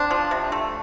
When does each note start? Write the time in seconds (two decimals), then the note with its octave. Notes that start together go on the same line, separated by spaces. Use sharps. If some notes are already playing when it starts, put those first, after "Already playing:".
Already playing: C4 D4
0.11 F3
0.31 C3
0.52 A3